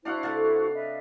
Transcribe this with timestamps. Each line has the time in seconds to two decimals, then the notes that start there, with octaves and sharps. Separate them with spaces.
0.05 D4 E4 F#4 C5 F5 F#5
0.23 C3 A3 F5 A5
0.74 D#5 E5 B5